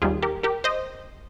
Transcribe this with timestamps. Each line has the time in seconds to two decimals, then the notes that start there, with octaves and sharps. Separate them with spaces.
0.02 D#2 D#3 G3 F4 G#4
0.22 G4 A#4
0.43 G4 A#4
0.64 C5 D#5